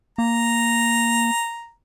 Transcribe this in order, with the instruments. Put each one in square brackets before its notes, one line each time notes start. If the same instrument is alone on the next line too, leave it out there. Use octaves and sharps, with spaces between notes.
[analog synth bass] A#3 [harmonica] A#5